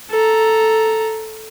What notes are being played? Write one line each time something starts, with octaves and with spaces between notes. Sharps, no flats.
A4 A#5